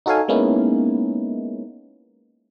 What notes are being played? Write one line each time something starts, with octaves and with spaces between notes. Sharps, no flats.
D#4 F#4 A4 C#5 F5 G#5
G#3 A#3 B3 C#4 D#4 E4